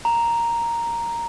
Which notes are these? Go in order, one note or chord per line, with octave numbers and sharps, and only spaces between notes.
A#5